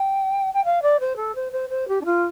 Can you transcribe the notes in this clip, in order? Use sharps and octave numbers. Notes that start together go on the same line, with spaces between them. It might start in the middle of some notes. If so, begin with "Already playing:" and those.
Already playing: G5
G5
F5
D5
C5
A4
C5
C5
C5
G4
D4
F4